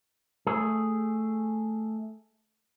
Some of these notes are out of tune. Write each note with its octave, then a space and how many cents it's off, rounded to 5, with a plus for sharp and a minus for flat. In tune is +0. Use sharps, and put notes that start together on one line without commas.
A3 +0 G#4 +0